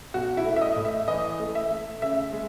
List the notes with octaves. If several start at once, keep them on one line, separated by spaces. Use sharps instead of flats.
B1 F#4
E4
A3
E5
D#5
A2
E5
E3 D#5
A3
E5
A3
C#3 E5
G#3